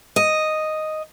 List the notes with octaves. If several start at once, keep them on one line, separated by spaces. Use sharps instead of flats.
D#5